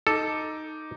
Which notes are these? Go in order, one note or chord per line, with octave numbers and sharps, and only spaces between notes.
D#4 A4 D6